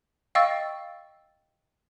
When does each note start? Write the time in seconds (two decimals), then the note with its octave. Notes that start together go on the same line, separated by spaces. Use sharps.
0.35 D#5 F5 G5 C#6 E6 A6